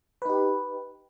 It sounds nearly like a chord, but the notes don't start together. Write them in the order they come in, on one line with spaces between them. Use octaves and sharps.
B4 D#4 G4